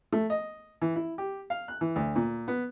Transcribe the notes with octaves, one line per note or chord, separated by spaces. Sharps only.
A3
D#5
E3
E4
G4
F5
F#6
E3
D2
A#2
B3